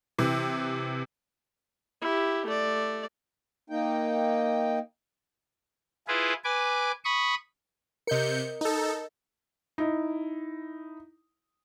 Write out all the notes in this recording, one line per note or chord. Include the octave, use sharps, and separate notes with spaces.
C3 E3
E4 G4
A3 D5
A#3 D#4 G5
E4 F4 G#4 B4
B4 G#5 D6
B5 C#6 D#6
C3 A#4 D#5 G6 C#7
D#4 A4
D#4 E4